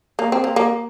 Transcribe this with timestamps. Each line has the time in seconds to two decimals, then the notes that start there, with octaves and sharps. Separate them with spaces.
0.19 A#3
0.32 C4
0.44 A#3
0.56 A#3